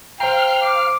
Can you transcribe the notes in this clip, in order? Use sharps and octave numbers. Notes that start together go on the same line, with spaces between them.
C5 F5 G5 A#5 F6
D6